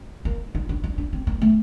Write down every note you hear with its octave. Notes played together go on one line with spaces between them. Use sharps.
A#3
D#4
D4
D4
D4
C4
A#3
A3